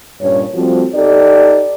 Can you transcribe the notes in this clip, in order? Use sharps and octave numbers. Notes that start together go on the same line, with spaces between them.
G2 A#2 C#4 C#5
F3 G3 A3 C4 F4 F#4
D#4 G4 A4 D5